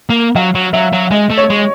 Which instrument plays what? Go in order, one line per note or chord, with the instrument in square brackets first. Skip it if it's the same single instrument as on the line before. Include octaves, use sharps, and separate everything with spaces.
[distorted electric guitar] A#3
[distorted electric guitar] F#3 [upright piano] F5
[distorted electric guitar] F#3
[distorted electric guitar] F#3 [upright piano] E5
[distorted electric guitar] F#3
[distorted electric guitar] G#3 [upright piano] D#5
[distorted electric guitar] A3
[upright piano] C#5
[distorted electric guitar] G#3